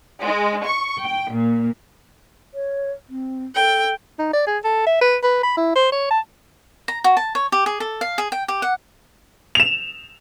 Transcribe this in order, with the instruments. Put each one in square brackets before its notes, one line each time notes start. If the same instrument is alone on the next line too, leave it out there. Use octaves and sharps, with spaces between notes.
[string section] G#3
C#6
G5
A#2
[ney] C#5
C4
[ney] A4 [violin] G5
[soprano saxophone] D#4
D5
G#4
A4
E5
B4
B4
B5
E4
C5
C#5
A5
[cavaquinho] A#5
F#4
A5
C#5
G4
G#4
A4
F5
G#4
G5
G4
F#5
[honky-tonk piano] E7 F7